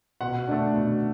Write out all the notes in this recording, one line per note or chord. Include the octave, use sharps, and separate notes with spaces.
B2 F#5
A3 D4
B2